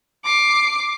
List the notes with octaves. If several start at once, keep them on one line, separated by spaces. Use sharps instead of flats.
D6 C7